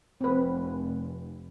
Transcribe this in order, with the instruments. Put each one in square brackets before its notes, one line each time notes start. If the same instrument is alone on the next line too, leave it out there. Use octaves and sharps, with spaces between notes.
[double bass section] F1 [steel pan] C4 B4